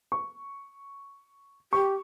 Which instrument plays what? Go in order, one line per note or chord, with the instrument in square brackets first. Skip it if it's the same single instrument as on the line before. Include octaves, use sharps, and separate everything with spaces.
[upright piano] C#6
[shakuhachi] G4 [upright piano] C#6